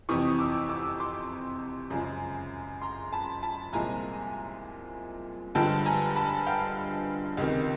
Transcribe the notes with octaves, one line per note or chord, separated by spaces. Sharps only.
F2 C3 E3 C#6 D#6
D6 E6
D6 E6
C6 D6
F#2 C#3 F3 G#3
A#5 C6
A5 B5
A5 B5
C2 A#2 F3 G#3 G#5 A#5
G2 D3 F3 G#3 G5 A5
G#5 A#5
A5 B5
F5 G5
C#2 C3 D#3